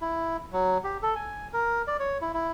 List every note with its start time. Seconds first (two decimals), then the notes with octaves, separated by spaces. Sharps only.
0.01 E4
0.52 F#3
0.84 G4
1.02 A4
1.15 G#5
1.53 A#4
1.88 D5
2.00 C#5
2.21 E4
2.34 E4